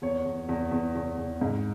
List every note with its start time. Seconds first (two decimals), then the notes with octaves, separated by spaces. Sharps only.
0.02 E2 C#5
0.26 E2
0.49 E2
0.71 E2
0.95 E2
1.17 E2
1.41 G#2